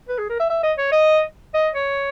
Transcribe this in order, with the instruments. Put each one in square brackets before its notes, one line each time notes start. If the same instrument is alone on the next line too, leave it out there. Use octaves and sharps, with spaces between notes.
[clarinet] B4
G#4
A#4
E5
E5
D#5
C#5
D#5
D#5
C#5